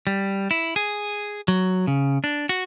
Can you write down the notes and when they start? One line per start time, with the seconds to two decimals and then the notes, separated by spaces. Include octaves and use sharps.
0.07 G3
0.51 E4
0.76 G#4
1.48 F#3
1.87 C#3
2.24 D4
2.49 F#4